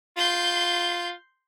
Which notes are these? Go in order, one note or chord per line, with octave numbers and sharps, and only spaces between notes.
F4 C6 G6